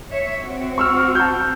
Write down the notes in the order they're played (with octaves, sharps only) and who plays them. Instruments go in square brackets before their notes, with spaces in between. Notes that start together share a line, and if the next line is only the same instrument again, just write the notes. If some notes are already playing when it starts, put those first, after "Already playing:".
[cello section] C#5 E5
C4 F#4
[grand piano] C#6 E6 F6
A5 G6